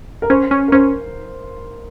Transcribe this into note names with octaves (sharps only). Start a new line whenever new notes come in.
A#4
C#4 C5
C#4
A#4
C#4 C5